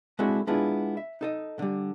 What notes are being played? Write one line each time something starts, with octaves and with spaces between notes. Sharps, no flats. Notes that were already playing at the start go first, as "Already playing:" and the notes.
G#3 C4 D4 E4 F#4 A4
G#3 B3 D4 E4 F4 G#4
E5
D#4 A4 D#5
D3 G3